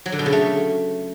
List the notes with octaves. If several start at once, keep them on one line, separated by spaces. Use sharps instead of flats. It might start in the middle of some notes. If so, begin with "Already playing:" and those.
F#3
D3
B2
C#3
A3